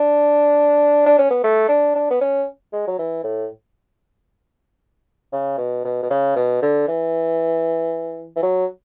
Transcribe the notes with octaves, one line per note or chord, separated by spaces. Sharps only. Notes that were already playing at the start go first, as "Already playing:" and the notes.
Already playing: D4
D4
C#4
B3
A3
D4
D4
B3
C#4
G#3
F#3
E3
A2
C#3
B2
B2
B2
C#3
B2
D3
E3
E3
F#3